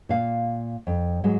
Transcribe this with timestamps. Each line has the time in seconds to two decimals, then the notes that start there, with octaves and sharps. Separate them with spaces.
0.09 A#2 F5
0.87 F2
1.24 G#2 F#3 G#3